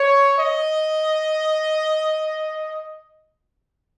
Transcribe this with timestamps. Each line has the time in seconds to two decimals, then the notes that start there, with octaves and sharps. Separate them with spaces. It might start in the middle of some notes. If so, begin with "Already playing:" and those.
Already playing: C#5
0.37 D#5